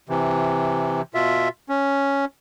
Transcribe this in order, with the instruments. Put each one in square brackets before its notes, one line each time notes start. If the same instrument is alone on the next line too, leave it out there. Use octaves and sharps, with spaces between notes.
[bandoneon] C3 E3
B2 F4 E5
C#4